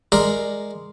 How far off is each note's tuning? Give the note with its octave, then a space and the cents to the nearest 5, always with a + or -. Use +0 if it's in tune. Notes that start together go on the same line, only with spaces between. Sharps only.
G#3 +5 A#4 +0 D5 +10